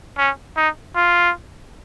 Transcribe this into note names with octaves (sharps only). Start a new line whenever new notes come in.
C#4
D#4
F4